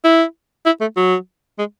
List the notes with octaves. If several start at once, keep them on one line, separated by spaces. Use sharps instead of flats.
E4
E4
A3
F#3
G#3